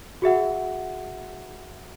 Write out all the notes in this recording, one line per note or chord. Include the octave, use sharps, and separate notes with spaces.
F#4 G#4 E5 F#5